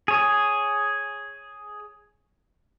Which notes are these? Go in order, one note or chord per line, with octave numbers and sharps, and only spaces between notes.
G#4 C#5